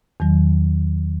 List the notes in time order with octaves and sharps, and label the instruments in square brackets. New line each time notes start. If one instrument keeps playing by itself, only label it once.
[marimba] E2 D#3 F#3